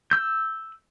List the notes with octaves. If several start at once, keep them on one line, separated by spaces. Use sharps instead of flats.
E6 G6